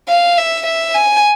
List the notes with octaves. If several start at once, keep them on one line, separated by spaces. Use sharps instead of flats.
F5
E5
E5
G#5